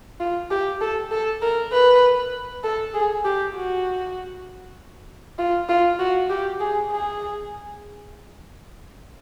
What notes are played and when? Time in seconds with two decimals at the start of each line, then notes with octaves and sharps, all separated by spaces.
0.20 F4
0.51 G4
0.81 A4
1.11 A4
1.42 A#4
1.72 B4
2.64 A4
2.94 G#4
3.25 G4
3.56 F#4
5.38 F4
5.69 F4
5.99 F#4
6.30 G4
6.60 G#4
6.91 G#4